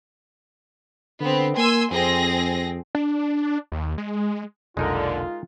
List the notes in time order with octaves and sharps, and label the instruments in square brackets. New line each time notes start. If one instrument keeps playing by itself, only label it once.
[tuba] D3 [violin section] B3 C4
[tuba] A#3 [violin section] G#5 C6 E6
[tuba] F2 [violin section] C4 G#4 A#6
[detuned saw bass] D4
D#2
G#3
[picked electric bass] F1 B1 [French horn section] A#2 D3 [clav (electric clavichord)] G#3 D#4 A#4 [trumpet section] F4